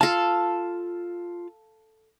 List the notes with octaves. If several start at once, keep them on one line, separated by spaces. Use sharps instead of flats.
F4 A4 F5 A5